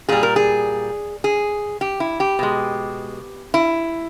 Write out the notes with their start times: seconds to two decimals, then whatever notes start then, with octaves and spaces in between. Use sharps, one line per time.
0.09 A#2 G3 G#4
0.23 A#4
0.36 G#4
1.24 G#4
1.81 G4
2.00 E4
2.20 G4
2.39 B2 G#3
3.54 E4